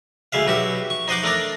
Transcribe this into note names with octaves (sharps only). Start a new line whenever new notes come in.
D2 G#3 E5 F5
B1 F#4 G4 E5
C#6
D#4 C5 D#5 F#5 D6
A3 D4 A#4 D5